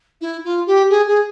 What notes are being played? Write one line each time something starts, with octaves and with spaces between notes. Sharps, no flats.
E4
F4
G4
G#4
G#4